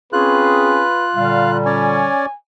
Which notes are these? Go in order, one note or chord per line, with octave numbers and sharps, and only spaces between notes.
C4 C#4 F4 G#4 B4 F#6
A#2 D3 G3 F5
C#4 C#5 D5 G#5